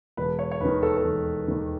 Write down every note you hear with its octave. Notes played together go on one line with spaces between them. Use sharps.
E1 B4
C#5
C#5
D#2 D#3 B4
A4
A4
E1
D#2 D#3